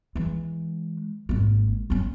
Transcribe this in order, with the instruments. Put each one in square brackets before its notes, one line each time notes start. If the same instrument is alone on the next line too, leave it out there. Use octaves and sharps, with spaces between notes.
[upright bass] E3 G#3
G#1 A#3
A#3 C#4